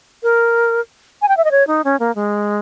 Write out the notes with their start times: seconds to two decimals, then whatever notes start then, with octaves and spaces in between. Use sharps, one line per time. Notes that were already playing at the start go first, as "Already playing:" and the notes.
0.23 A#4
1.22 G#5
1.28 G5
1.37 E5
1.44 D#5
1.51 C#5
1.67 D#4
1.84 C#4
2.00 A#3
2.15 G#3